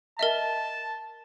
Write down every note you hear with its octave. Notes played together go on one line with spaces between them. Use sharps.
A#4 D#5 E5 A5